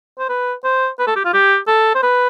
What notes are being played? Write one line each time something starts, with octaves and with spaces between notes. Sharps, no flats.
C5
B4
C5
B4
A4
G4
F4
G4
A4
C5
B4